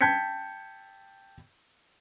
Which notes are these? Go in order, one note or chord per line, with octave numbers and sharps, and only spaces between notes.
G5 A5 G6 G#6 B6 C#7